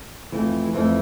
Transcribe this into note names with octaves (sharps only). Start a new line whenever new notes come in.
F2 E3 A3
F2 E3 A3